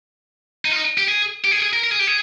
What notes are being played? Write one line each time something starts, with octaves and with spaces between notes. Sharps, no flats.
D#4
F4
D#4
G4
G#4
G4
G#4
G#4
A#4
A#4
G#4
G4
G#4